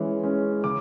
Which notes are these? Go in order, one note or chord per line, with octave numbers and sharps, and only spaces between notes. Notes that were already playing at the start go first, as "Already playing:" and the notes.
Already playing: E3 G#3 C#4
G#3 C#4
C#3 D6